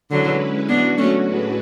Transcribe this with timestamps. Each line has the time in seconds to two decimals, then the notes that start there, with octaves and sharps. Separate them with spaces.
0.11 D3 F#3 G#3 C#4 E4 B4
0.69 F#3 B3 C#4 D4 F#4
0.98 A3 C#4
1.27 A2 G#3 D4 F#4 B4